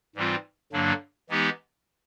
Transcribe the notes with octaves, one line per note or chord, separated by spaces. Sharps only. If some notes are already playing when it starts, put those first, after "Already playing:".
G#2 E3 G3 C4 F4
G2 D3 F#3 A#3 D4
E3 G#3 B3 D#4 G4